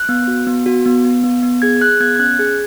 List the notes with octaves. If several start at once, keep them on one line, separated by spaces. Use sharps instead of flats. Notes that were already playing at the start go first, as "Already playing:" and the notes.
Already playing: F#6
B3
F#4
B3
F#4
B3
B3
B3
B3
G#4 G#6
G#4 F#6
B3 G#6
G#6
C#4 F#6
G#4 G#6